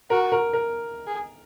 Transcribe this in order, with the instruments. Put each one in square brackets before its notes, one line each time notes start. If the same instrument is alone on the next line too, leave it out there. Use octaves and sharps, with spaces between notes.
[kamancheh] F#4 [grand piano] A#4
[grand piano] A#4
A#4
[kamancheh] G#4